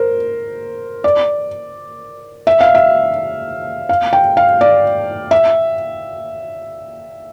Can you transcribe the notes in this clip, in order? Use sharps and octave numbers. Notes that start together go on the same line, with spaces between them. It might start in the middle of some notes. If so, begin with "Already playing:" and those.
Already playing: A#4 C5
D5
E5
F5
E5
F5
G5
F5
D5
E5